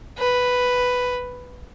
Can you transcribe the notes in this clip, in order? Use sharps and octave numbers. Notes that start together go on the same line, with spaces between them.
B4